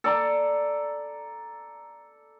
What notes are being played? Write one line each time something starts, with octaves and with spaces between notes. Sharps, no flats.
A4 D5 A#5